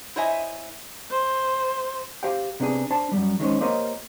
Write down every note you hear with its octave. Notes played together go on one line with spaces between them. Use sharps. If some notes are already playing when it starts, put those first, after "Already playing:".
E4 C5 C#5 D#5 E5 G#5
C5
G4 C5 F5 G5
C3 B3 D4 G#4
D4 C5 A5
F#2 F#3 G3
D#3 G#3 C#4 C5
A#3 G4 A#4 C5 C#5 D#5